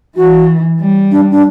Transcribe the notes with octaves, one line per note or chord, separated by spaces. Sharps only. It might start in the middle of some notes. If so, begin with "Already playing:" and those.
E3 F#4
G3
D4
D4